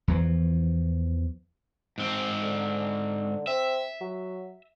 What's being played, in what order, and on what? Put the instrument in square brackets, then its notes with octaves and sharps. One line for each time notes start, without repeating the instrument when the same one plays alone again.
[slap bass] E2 E3 F3
[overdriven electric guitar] G#2 C4
[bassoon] D3
[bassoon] C4 [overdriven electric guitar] E5
[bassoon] F#3